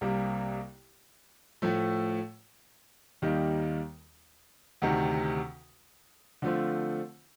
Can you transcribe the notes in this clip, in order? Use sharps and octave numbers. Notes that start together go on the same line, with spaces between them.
C2 C3 G3 A#3
A2 F3 A3
D#2 D#3 G3 A#3 D#4
D2 C3 D#3
D3 F3 A3 C4 F4